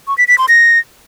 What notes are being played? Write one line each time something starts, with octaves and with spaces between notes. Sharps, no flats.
C#6
B6
B6
C6
A#6